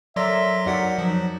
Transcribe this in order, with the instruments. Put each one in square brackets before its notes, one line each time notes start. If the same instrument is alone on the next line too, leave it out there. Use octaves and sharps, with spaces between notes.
[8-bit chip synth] F#3 C6 A#6 [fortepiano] A4 A#4 D5 [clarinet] E5
[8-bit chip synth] F2 F#5 B6 [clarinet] F#3 [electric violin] D#4 [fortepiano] F#4 A#4 D5
[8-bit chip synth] F3 [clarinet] F#3